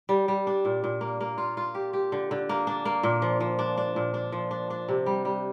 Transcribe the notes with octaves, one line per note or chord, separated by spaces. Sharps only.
G3
G3
D4
A#2
A#2
A#3
A#3
F4
F4
G4
G4
D3
D3
A#3
D4
A#3
A#2
F3
F3
D4
D4
A#2
D4
F3
D4
D4
C3
G3
G3